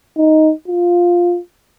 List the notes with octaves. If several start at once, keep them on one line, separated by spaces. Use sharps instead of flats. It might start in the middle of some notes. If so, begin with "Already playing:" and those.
D#4
F4